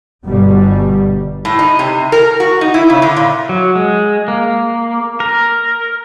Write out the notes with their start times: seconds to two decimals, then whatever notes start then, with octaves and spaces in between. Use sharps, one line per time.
0.24 G1 B2 G3
1.45 A2
1.59 D#4
1.79 C3
2.12 A#4
2.40 F#4
2.61 D#4
2.74 E4
2.90 C#3
3.02 D3
3.17 A#2
3.49 F#3
3.75 G#3
4.28 A#3
5.20 A#4